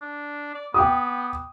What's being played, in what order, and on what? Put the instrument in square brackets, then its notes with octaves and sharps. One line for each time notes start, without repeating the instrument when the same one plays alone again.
[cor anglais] D4
D5
[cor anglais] B3 [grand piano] G5 D6 D#6